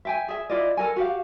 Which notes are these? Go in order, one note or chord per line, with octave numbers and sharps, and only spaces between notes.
E5 G5 G#5
G#4 E5
E4 F4 D5 D#5
A4 A#4 G#5
F#4 G4 F5